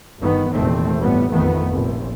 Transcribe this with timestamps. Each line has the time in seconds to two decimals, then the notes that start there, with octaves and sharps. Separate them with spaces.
0.19 G1 G2 D#3 B3
0.53 F1 E2 A#2 D#3 A3 C4
1.00 G1 A2 G3 B3
1.31 A1 F2 D#3 A3 B3
1.70 F1 A#1